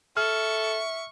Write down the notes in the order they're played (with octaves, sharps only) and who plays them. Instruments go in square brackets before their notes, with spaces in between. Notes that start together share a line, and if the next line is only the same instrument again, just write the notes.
[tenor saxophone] A4 [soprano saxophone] E5 [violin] C#6 [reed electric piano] F6